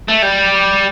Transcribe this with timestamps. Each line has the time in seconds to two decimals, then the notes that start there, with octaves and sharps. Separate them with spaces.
0.08 A3
0.22 G3